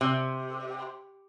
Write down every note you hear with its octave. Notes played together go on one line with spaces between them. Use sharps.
C3